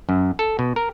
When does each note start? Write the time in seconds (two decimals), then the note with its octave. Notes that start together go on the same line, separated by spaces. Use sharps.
0.09 F#2
0.39 A4
0.59 B2
0.76 A#4